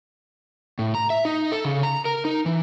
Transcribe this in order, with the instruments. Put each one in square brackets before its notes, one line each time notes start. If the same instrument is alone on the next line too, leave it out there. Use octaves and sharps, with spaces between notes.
[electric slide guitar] A2
A#5
E5
D#4
A4
C#3
A#5
A#4
D#4
E3